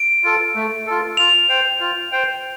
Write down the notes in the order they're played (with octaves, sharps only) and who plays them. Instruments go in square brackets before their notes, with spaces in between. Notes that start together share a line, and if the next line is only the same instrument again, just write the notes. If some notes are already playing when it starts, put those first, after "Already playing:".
Already playing: [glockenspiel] D7
[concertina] F4 A4
A3
F4 A4
[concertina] F4 [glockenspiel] F7
[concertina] C5 G5
F4
C5 G5